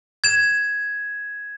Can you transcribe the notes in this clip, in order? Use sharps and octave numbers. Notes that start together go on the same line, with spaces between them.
G#6 E7